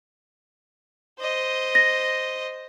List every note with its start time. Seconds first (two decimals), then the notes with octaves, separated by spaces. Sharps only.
1.19 C5 D#5
1.75 A#6